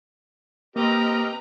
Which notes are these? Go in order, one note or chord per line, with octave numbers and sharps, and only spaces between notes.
A#3 C4 G4 A#4 B4 D#5 A#5